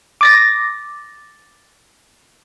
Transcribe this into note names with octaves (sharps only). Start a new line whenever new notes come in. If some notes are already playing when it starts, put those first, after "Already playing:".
D6 A6 A#6